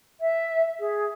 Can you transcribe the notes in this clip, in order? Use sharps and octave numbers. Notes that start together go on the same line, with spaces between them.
E5
G#4